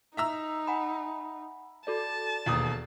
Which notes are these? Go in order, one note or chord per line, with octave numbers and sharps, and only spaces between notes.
D#4 E5 A#5 E6
F#5 G#5 B5
F#4 A4 D5 A5
E1 D#2 D#6